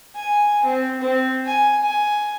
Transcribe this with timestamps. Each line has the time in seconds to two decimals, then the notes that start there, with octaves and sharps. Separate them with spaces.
0.15 G#5
0.65 C4
1.01 C4
1.46 G#5
1.83 G#5